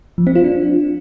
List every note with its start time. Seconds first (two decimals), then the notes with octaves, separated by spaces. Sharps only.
0.18 F3
0.27 C4
0.35 F4
0.44 D4